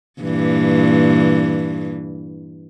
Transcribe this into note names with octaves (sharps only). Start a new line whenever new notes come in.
G2 A#2 E3